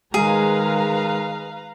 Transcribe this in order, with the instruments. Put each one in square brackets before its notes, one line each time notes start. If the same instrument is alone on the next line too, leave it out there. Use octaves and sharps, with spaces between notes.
[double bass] D#3 G#3 [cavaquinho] G#4 [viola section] B4 F5 A#5